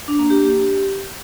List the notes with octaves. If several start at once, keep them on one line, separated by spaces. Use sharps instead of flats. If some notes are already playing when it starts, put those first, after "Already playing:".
D4
A#3
G4